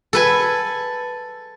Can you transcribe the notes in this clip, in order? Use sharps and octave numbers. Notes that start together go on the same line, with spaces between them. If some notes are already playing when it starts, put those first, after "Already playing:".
A4 B4 G#5